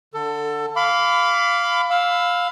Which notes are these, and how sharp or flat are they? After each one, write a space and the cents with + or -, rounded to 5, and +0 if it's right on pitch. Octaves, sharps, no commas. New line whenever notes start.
D3 +0 A4 +20
F5 +0 B5 +25 D6 -20
F5 +15 B5 +25 E6 +0